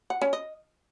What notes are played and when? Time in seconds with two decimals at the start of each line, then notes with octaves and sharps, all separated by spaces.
0.10 F#5
0.22 C#4
0.33 D#5